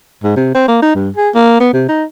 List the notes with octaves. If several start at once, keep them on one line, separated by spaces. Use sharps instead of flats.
G#2
C3
C4
A#3
D#4
G2
G#4
A#3
B3
C3
D#4